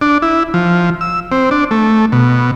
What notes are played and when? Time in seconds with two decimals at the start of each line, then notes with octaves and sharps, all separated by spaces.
0.01 D4
0.22 E4
0.54 F3
1.01 E6
1.32 C4
1.51 D4
1.71 A3
2.12 B2